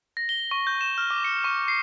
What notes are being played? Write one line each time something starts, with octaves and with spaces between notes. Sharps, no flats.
A#6
G7
C#6
G6
E7
F6
D6
C#7
C#6
C7